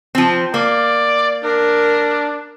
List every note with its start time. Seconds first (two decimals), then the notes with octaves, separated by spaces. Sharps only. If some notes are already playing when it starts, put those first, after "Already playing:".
0.15 F3 C4
0.54 A#3 D5
1.44 D4 A#4